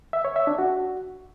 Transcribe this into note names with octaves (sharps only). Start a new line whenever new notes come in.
E5
C#5
E5
D4
F#4